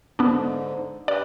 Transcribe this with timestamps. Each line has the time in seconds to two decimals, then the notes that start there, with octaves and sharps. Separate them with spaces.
0.19 G#2 D3 B3 D4
1.08 D4 G4 B4 D5